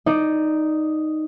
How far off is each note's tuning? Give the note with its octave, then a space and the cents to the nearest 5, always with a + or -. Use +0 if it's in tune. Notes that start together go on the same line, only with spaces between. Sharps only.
D#4 +0 D5 +10